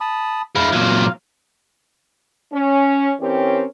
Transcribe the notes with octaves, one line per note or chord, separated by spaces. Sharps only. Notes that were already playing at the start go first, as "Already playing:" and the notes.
A5 B5 D#6
G#3 E4 F5
A#2 F#3
C#4
E3 C4 C#4 G4 A#4 C#5